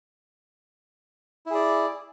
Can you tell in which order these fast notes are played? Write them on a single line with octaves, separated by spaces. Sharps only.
E4 G#4 D5